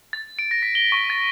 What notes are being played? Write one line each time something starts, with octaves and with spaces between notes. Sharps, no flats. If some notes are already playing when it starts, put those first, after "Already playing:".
A6
D7
A#6
B6
G7
C#6
A6